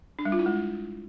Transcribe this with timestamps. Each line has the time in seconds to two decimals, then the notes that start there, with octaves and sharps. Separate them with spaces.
0.19 D4
0.25 G3
0.32 F4
0.39 E4
0.46 G#3